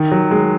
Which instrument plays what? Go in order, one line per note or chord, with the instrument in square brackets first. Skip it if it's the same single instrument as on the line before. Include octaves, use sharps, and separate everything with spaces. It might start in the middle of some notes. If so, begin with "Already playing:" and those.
Already playing: [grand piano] D#3
F#3
G#3